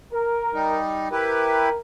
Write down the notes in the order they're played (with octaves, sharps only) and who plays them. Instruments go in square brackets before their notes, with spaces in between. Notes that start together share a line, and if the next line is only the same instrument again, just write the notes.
[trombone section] A#4
[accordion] G3 D#4
[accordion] E4 G4 B4 [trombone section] A#4